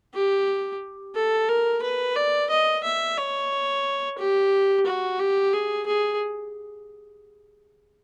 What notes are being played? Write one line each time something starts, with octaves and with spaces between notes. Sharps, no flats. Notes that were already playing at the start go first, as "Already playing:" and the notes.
G4
A4
A#4
B4
D5
D#5
E5
C#5
G4
F#4
G4
G#4
G#4